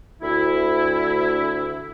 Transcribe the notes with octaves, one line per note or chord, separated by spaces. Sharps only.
D2 E4